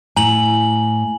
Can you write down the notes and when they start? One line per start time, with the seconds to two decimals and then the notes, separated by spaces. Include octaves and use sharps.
0.17 A2 G#5 A#5 F#7